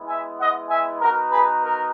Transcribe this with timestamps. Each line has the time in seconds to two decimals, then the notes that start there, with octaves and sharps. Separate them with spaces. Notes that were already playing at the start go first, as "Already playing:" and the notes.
Already playing: G#3 B3 E4
0.08 E5 G#5
0.39 D#5 F#5
0.70 E5 G#5
1.01 B3 D#4 F#4 A#4
1.31 G#4 B4
1.63 A#4